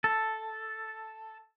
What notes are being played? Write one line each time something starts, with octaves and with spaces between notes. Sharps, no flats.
A4